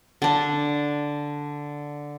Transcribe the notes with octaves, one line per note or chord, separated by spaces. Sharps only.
D3 D4